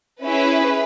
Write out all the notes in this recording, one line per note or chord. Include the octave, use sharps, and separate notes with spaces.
C#4 E4 G#4 B4